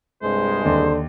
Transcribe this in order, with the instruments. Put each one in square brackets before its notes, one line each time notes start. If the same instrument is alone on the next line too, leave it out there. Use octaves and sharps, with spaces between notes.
[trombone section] C2 G2 G#3 [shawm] C5
[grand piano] D#2 [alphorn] D3